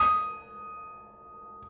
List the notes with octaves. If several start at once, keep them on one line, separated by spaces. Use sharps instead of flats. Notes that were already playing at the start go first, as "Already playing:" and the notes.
Already playing: D#6